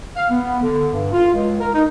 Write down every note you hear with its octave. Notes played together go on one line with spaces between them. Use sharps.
F5
B3
D3
G2
F4
C#2
A#4
D#4